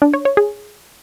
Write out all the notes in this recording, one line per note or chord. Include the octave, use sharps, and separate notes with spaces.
D4
C#5
C#5
G#4